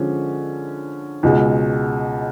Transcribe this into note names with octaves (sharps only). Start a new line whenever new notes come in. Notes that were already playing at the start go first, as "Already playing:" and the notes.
Already playing: D3 F3 G#3 C#4
C#2 B2 G#3